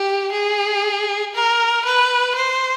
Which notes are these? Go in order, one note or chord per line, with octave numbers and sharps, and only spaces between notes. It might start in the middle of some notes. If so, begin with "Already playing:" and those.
Already playing: G4
G#4
A#4
B4
C5